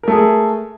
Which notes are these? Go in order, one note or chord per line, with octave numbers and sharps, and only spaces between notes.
A3 G#4 A#4